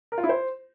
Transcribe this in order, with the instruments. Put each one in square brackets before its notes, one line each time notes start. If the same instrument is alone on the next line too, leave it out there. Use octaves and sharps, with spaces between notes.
[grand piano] A#4
F4
E4
C5